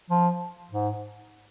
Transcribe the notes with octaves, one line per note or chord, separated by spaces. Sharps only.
F3
G#2